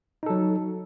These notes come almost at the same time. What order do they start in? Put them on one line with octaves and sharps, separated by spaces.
D#4 A4 F#3